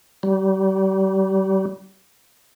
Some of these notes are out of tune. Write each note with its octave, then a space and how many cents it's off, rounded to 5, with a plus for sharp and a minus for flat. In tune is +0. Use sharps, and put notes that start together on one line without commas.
G3 -35